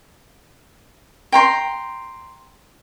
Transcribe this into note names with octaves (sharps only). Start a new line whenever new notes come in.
G5 A#5 C6